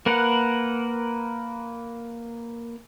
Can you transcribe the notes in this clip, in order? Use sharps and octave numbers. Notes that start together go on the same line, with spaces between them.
A#3 A#4 B4 F#5